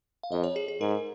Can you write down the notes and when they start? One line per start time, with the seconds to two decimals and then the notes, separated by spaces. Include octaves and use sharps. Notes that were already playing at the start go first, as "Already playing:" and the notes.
0.23 F5
0.31 F2 D#5
0.44 C#5
0.56 G#4
0.68 G#4
0.80 G#2 A#4